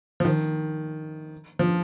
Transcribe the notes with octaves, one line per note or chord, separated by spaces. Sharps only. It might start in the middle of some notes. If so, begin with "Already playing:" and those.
F3
D#3
F3